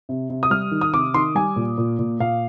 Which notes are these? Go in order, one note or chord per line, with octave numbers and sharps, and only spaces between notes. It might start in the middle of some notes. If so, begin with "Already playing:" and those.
C3
C3
D#6
G3 F6
D#3
D#6
C3 D6
D#3 C6
G3 G#5
A#2
A#2
A#2
A#2 F5